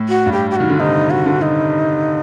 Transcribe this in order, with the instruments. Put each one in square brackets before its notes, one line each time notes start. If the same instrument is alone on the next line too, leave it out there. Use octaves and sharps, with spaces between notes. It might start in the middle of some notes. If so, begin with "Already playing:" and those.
Already playing: [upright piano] A2
[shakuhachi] F#4
[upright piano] G2
[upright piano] A2 [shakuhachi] G4
[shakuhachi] G4
[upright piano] D#3 [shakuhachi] F#4
[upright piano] D3
[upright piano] C3 [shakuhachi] D#4
[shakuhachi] F#4
[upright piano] D3
[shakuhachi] D#4